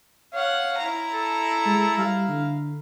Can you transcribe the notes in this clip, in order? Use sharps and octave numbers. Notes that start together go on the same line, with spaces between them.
C#5 F5 F#5
E4 A#5
A4
G#3
G3 F5
D3